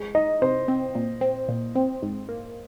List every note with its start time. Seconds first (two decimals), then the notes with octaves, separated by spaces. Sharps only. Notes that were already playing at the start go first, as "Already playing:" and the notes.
Already playing: G#3
0.15 D#4 D#5
0.42 C3 C5
0.68 C4
0.95 A#2
1.21 C4
1.49 A#2
1.75 C4
2.02 G#2
2.29 A#3